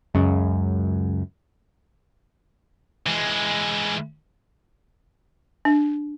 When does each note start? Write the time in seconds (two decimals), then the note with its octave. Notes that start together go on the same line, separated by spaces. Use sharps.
0.14 C#2 F#2 C#3
3.07 E3 G#3
5.65 D4